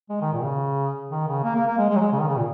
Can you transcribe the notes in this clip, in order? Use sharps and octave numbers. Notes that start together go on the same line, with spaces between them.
G#3
D#3
A#2
C#3
D#3
C#3
A#3
A#3
A#3
G#3
G#3
F#3
G#3
C#3
D#3
C#3
A#2